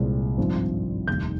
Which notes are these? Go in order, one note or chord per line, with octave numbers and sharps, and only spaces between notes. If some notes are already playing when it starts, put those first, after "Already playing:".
Already playing: C2 A#2 G#3 C4
G#1 G2 F3 C4
F1 D#2 D#3 G3 G6